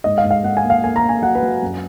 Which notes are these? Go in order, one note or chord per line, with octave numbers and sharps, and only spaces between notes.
G#2 D#5
F5
G#2
F5
G#2 F#5
G#5
A#3
F5
A#3 G#5
A#5
A#3
G#5
F#3 F#5
B4
F#3
F#2